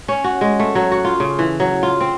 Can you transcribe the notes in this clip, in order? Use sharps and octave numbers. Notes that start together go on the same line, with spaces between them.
C#4
F#4
G#3
A3
F#3
F#4
F4
C#3
E3
F#3
F4
C4